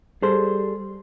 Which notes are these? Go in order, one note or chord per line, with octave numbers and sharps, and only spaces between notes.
G3 G#4 A4 C5